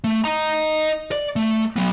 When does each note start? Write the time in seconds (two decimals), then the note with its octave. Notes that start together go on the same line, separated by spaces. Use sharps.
0.04 A3
0.24 D#5 A#5
1.12 D5
1.36 A3
1.76 F#3 B3